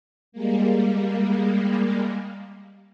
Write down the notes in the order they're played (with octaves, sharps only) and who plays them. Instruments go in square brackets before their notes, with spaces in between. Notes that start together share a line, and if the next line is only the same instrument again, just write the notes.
[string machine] G3 G#3 A#3